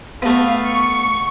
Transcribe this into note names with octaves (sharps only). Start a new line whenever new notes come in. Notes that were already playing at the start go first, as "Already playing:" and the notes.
A3 B3 F5
C#6